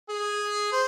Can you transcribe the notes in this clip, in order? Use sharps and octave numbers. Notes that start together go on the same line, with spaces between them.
G#4
C5